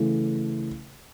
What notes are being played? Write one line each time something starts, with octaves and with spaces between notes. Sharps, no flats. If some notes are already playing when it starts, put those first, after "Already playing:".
Already playing: C#3 E3 A3